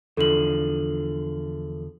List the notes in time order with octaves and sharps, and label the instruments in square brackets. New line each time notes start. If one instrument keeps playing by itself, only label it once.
[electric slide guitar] E2 D3 F3 [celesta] A4 F#7